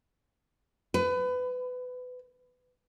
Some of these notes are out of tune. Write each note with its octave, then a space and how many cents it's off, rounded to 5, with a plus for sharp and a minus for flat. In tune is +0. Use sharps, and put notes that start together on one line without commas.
B4 +25